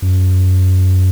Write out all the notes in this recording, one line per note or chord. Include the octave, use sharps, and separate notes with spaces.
F#2